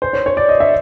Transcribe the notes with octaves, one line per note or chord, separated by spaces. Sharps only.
C5
C#5
C#5
D5
D#5
E5